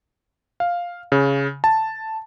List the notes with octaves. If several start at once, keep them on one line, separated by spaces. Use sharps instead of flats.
F5
C#3
A5